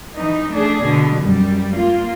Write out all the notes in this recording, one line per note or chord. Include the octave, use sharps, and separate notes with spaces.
E3 D#4
A3 D4 G#4
B2 D3
F#2 G3
A#3 F4